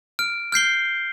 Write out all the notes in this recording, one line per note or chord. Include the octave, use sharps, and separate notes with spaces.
F6 D7
F6 G6 C7 G7